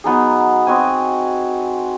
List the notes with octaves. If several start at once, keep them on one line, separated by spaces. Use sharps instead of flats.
F#3 B3 D#4 G#4
C4 F#4 D#5 G#5